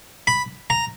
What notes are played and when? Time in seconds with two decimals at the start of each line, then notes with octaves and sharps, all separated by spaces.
0.27 B5
0.70 A#5